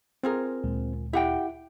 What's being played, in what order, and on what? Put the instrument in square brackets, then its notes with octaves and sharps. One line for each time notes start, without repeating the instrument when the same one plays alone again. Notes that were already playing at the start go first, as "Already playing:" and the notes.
[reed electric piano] C4 [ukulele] F4 G#4 A#4
[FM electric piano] D2 A#2 G#3
[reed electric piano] E4 [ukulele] G4 F#5 G5